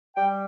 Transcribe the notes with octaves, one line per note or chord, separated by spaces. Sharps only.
G3 G5